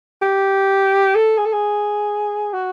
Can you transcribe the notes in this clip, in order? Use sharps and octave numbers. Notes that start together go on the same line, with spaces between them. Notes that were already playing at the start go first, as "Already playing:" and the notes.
G4
A4
G#4
A4
G#4
F#4